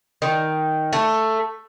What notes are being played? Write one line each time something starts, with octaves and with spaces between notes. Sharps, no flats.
D#3
A3